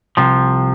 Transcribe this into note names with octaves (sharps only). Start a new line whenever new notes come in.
C2 C3 F3